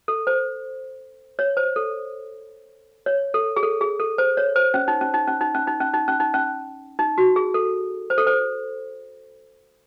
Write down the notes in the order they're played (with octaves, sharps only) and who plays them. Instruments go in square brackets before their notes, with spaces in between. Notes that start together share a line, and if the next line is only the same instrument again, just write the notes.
[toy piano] A4
C5
C#5
C5
A4
C#5
A4
G#4
A4
G#4
A4
C5
C#5
C5
C#4
D#4
C#4
D#4
C#4
D#4
C#4
D#4
C#4
D#4
C#4
D#4
C#4
D#4
F#4
G#4
A4
C5
A4
C5